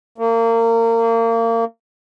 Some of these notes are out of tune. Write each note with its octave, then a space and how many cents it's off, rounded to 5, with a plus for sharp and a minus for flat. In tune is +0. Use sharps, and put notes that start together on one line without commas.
A#3 -30